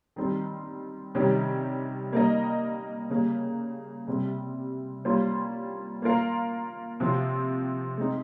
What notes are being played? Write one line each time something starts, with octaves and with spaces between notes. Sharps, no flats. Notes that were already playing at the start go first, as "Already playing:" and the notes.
D#3 G3 C4
C3 D#3 G3 C#4 G4
G3 A#3 D#4 A#4 D#5
C#3 G3 A#3
C3 G3 C4 G4
G3 A#3 C#4 F4 C5
A#3 F4 A#4 F5
C3 F3 C4 F4
G#3 C4 D#4